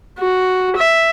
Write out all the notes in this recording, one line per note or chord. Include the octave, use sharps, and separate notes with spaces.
F#4
E5